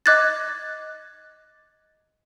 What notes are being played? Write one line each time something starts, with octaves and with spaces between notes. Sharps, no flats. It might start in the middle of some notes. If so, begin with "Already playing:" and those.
D#5 D6 F#6 G#6 A6